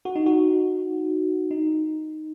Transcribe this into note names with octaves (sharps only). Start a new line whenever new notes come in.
F#4
D#4
F#4
D#4